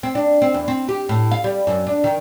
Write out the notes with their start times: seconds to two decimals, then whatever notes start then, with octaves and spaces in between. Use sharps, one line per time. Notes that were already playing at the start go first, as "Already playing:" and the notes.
0.03 C4
0.15 D4
0.42 C4
0.54 E2
0.68 C4
0.89 G4
1.09 A2
1.31 F5
1.44 G3
1.67 F#2
1.87 D4
2.04 D#3